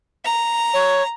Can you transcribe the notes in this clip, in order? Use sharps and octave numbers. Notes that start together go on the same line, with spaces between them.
A#5
C#5